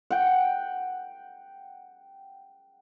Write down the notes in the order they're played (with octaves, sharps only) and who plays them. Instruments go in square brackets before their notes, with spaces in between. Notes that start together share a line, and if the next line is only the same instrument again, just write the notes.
[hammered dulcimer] F#5 G5